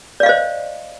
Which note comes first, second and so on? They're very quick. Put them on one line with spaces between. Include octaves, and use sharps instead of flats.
D5 F5 D#5 C5